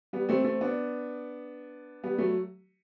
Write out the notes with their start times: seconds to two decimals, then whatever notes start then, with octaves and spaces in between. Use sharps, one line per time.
0.13 G3 B3
0.29 A3 C4
0.45 A3 C4
0.61 B3 D4
2.04 G3 B3
2.18 F#3 A3